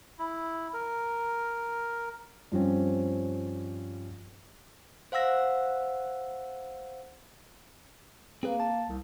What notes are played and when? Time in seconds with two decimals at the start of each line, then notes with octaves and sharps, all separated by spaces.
0.19 E4
0.73 A#4
2.52 G2 F3 C4 C#4
5.12 C5 F5 F#5 E6 A#6
8.43 A#3 C4 G#4 B4
8.60 A5
8.89 C2